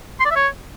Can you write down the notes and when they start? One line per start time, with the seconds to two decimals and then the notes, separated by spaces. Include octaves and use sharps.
0.20 C6
0.25 D5
0.31 E5
0.36 C#5